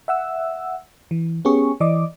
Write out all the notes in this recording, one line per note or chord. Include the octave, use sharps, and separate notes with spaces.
E5 F#5 E6
E3
B3 C#4 G4 G#4 C#6
E3 D5 D#5 D6